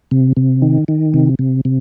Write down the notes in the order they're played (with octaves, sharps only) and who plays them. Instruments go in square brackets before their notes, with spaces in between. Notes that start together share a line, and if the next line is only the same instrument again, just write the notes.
[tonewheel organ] C3
C3
D#3
D#3
C3
C3
C3